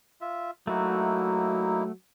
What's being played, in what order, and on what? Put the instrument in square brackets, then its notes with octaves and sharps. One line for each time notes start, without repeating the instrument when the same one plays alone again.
[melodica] F4 E5
[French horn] F#3 [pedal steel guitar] A3 F#4 [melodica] A#3 D#4 E4